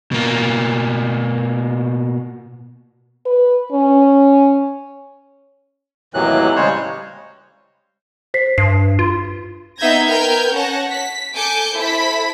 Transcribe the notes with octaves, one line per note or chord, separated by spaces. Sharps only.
B2 A#3
B4
C#4
D#2 A2 C3 E3 F#3 F#6
C#3 G3 G#3 C5 C#5
C5 B6 C7
G2 C7
F4
B3 D#4 E5 G6 G#6 A#6
A#4 B4 G5 F6 G6 G#6
C#4 C#5 F#5 A5 A#6
B6
A4 G#5 D6 G6 C#7
E4 A4 C5 B5 B6